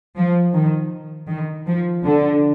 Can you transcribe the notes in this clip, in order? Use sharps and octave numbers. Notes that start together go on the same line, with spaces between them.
F3
D#3
D#3
F3
D3